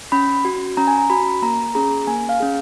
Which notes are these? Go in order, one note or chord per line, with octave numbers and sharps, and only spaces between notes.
C#4 B5
F#4
C#4 A#5
G#5
A#5
F#4 B5
A#3 A#5
C#4 G#4 A#5
A#3 G#5
F5
C#4 G#4